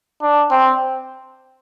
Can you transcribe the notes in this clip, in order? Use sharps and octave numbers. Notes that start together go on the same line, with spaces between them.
D4
C4